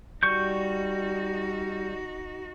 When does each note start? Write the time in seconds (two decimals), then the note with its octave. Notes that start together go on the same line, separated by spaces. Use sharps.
0.23 G3 D#4 F#4 C#6 G6